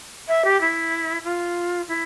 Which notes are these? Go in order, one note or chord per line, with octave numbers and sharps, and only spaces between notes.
E5
G4
E4
F4
E4